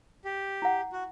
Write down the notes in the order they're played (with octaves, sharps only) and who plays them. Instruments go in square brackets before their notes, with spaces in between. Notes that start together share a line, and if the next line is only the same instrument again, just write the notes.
[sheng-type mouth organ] G4
[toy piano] E4 F#5
[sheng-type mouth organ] F#4